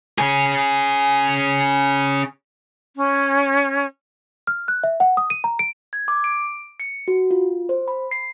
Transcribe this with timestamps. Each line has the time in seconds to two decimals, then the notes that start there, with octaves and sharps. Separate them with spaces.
0.18 C#4 G#4
2.96 C#4
4.47 F6
4.68 F#6
4.84 E5
5.00 F#5
5.17 D#6
5.30 D#7
5.44 A#5
5.59 D7
5.93 G#6
6.08 D6
6.24 D7
6.80 C#7
7.08 F#4
7.31 F4
7.69 C5
7.88 B5
8.11 C7